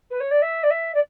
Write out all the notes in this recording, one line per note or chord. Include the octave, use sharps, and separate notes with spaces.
B4
C#5
D5
E5
D5
E5
D5